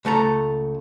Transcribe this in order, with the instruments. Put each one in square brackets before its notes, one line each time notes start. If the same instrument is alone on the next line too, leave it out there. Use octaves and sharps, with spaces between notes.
[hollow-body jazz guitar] C#2 A3 A4 A#5